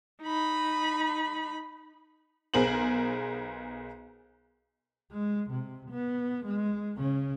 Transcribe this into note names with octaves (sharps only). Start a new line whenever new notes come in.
D#4 B5
B1 B3 G#4 A#4 C5 F#7
G#3
C3
B3
G#3
C#3 C#4